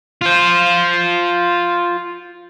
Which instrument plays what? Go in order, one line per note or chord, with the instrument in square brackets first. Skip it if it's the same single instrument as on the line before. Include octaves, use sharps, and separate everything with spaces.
[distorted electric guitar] F4 C5